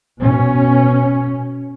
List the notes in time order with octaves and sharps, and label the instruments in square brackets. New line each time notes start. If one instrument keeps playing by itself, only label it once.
[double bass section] B2 C#4